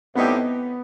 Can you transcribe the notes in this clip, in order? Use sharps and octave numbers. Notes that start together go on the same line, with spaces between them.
A2 G3 B3 C4 D#4 G4